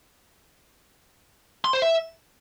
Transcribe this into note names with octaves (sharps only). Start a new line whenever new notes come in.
C6
C5
E5